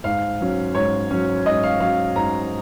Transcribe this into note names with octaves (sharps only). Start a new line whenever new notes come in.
G#2 F5
F#3 C#4
G#2 C#5
F#3 C#4
G#2 D#5
F5
F#3 C#4 F5
G#2 A#5